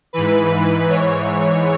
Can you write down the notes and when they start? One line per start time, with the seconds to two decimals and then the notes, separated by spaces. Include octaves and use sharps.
0.13 G#2 E3 B4
0.51 G#2 E3
0.89 G#2 E3 C#5